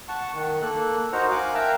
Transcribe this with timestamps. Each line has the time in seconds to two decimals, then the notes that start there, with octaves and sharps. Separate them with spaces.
0.09 F#5 A5 C#6
0.34 D#3
0.62 A#3 A4 F#6
1.13 D#4 F#4 A#4 C5 F#5 A#5
1.31 F5 G#5 D6 F#6
1.54 A#4 E5 F5 G5 A5 A#5